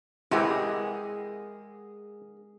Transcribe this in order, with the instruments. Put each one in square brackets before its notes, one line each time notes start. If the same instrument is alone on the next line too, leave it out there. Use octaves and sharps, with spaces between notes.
[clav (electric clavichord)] C3 E3 [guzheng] G#3 [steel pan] E4 G4 [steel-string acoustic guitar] G#4 A#4 F#5